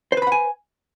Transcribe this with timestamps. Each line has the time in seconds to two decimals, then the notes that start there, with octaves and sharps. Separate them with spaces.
0.12 C5
0.17 B4
0.22 B5
0.27 F#5
0.32 G#5